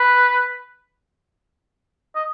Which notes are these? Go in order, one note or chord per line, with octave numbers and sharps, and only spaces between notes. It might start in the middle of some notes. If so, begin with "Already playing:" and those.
Already playing: B4
D#5